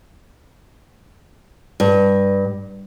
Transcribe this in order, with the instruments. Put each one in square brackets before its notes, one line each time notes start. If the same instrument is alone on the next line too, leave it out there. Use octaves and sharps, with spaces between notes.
[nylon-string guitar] G2